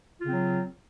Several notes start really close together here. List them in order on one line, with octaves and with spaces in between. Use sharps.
F4 C#3 C4 F#3